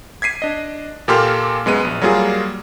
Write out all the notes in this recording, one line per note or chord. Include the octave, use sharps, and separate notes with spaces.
G#6 B6 C7 D#7
D4 D#5
A#2 A#3 G4 A4 C6 F6
F#2 G#3 B3 D#7
A#1
F#3 G3 A#3 F4 G#4